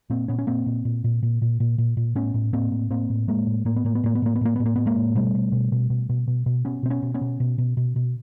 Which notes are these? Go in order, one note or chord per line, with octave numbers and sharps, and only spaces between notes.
A#2 A#3 C4
A#2 B3 C#4
C#4
A#2 A#3 C4
A#2
A#2
A#2
A#2
A#2
A#2
A#2
A#2
A2 B3 C#4
A2
A2 A#3 C4
A2
A2 A#3 C4
A2
A2 G#3 A#3
A2
A2 A#3
B3
A2 A#3
B3
A2 A#3
B3
A2 A#3
B3
A2 A#3
A2 B3
A#3
A2 B3
G#3 A#3
A2
B2 G3 A3
B2
B2
B2
B2
B2
B2
B2
B2 B3 C#4
B2 C4
B3 C#4
B2
B3 C#4
B2
B2
B2
B2
B2